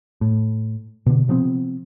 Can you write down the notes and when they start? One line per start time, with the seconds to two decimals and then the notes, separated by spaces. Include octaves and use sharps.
0.21 A2
1.06 B2 D3
1.28 C3 F3 B3 C4